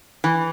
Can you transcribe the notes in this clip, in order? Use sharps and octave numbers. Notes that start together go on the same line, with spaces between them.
E3